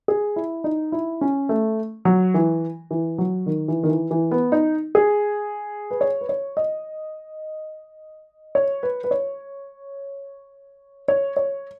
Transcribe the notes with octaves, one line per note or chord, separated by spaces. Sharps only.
G#4
E4
D#4
E4
C#4
A3
F#3
E3
E3
F#3
D#3
E3
D#3
E3
E3
B3
D#4
G#4
B4
C#5
B4
C#5
D#5
C#5
B4
B4
C#5
C#5
C#5